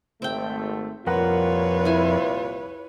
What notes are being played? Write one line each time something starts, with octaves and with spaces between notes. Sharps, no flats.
G#1 A3 C4 G5
C2 F2 A#2 F4 A#4 B4 C#5 F#5
E4 G#5